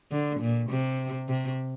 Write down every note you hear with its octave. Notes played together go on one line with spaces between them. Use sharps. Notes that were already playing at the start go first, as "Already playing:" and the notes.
D3
A#2
C3
C3